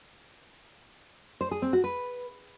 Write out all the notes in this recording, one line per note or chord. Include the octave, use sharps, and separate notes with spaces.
C5
G#4
C4
F#4
B4